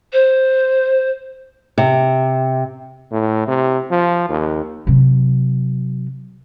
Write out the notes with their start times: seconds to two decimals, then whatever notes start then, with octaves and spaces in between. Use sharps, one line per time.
0.13 C5
1.78 C3
3.11 A2
3.47 C3
3.91 F3
4.29 D#2
4.87 C3 F#3